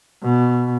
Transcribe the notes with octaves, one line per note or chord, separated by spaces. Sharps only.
B2